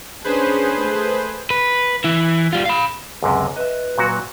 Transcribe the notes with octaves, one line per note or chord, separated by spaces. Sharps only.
C#4 D4 G#4 B4 C5
A3
B4
E3 E4
G3 F4
F5 B5
C#2 F#2 C3
B4 D#5 E5
A#2 F#3 F#4